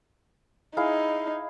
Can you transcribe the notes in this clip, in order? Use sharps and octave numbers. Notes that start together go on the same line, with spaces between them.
D#4 E4 G#4 F5